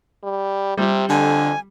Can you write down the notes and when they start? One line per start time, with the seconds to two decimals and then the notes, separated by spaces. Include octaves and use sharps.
0.24 G3
0.78 C3 G3
1.09 F2 D3 G#5